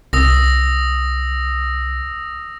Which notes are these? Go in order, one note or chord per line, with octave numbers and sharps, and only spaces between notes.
C2 D#6 E6 A#6